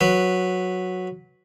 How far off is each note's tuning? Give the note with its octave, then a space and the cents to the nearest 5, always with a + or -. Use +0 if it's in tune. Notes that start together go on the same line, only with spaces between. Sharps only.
F#3 -10 B4 +0